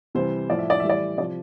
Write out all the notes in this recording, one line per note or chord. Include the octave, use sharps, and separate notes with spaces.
C3 E3 G3 C5
A2 F3 D5
E5
D5
A2 E3 G3 E5
D5
C3 F3 D5